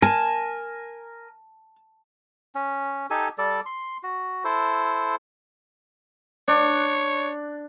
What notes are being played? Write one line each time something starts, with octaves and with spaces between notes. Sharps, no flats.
A#4 G#5 A5
C#4
D#4 G4 A4 G#5
G3 A4 D5
C6
F#4
E4 A4 C5
D4 C#5